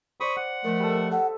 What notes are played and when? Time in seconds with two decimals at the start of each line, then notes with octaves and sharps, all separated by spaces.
0.20 C5 D5 B5 C#6 D#6
0.36 F#5
0.64 F3 A3 A#4 D#5
0.80 G3 A4
1.11 A4 E5 F#5